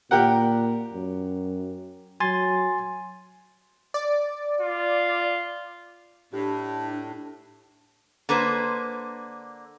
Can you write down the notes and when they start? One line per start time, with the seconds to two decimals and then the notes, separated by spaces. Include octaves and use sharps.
0.11 A#2 G4 A#4 F#5
0.93 F#2
2.20 F#3 G#5 C6 A6
3.94 D5
4.60 F4
6.33 A2 D4 G4
8.29 D3 A#3 B4 C5